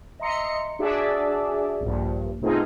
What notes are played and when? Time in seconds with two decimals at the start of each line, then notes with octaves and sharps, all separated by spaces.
0.20 D#5 E5 A#5 C6 C#7
0.79 D4 F#4 G#4 D5 E5
1.81 A#1 G2
2.41 B2 A3 C4 D#4 F4 G#4